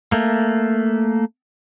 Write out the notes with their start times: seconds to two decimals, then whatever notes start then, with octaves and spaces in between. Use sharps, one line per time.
0.12 A3 A#3